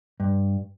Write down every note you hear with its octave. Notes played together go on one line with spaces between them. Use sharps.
G2